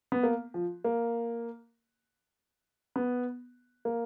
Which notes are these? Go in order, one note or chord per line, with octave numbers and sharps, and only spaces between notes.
B3
A#3
F3
A#3
B3
A#3